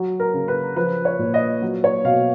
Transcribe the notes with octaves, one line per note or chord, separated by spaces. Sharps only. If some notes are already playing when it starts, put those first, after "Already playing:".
Already playing: F#3
A#4
C#3
B4
F3 B4
C#5
A#2
D#5
F#3
C#5
B2 F5